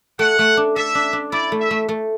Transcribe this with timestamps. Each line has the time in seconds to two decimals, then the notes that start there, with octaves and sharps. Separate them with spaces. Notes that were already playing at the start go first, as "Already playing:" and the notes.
0.19 A3 F#5
0.39 A3
0.57 D4
0.76 A4 E5
0.95 D4
1.13 D4
1.32 E4 D5
1.52 A3
1.60 E5
1.71 A3
1.89 A3